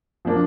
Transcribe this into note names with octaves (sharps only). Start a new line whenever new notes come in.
F3 A#3 D4